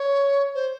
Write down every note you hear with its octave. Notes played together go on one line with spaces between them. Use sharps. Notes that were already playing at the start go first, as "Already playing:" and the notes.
Already playing: C#5
C5